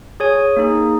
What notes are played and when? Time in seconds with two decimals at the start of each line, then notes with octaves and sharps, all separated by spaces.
0.20 G#4 C#5 G#5
0.57 A#3 D#4 G#4